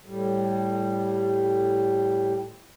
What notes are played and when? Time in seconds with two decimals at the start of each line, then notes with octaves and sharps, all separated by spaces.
0.06 A2 G3